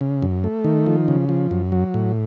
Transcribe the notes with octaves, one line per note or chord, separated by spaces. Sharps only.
C#3
F#2
A3
D#3
F3
C#3
F3
F#2
F#3
A2